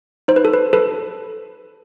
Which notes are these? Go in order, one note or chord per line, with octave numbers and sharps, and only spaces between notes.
D#4 C5
B4
A4
B4
A4 B4